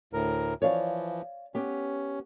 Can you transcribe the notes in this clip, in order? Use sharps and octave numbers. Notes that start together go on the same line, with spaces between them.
D2 A2 A#4
E3 F3 C#5 D5 F5
B3 C#4 G4